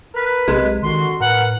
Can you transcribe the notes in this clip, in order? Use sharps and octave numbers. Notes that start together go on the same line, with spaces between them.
A#4 B4
B1 C3 G#3
D3 D#3 F#4 C6
A2 A#4 B4 F#5